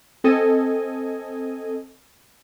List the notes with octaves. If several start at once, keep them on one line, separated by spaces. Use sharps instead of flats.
C4 A4 D#5 G#5